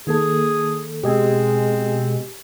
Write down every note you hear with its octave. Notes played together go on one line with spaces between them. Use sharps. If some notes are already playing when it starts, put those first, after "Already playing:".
D#3 A#3 G#4 A4
B2 G#3 C4 G4 D#5 G#5